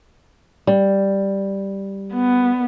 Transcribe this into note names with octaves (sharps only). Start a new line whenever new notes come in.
G3
B3